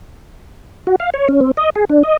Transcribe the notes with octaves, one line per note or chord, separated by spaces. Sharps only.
F#4
F5
C#5
C#4
C4
D#5
G#4
D4
D#5